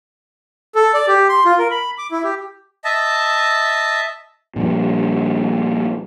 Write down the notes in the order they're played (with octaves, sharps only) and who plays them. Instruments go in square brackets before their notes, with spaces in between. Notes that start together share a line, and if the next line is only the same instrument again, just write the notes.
[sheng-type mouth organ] A4
D5
G4
C6
F4
A#4
B5
D6
E4
G4
D#5 E5 A5
[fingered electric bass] A#2 F3 G3